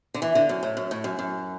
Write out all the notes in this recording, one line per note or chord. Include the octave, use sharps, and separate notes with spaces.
D3
E3
D3
F#2
A2
F#2
A2
F#2
F#2